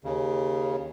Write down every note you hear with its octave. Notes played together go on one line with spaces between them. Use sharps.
D#2 C#3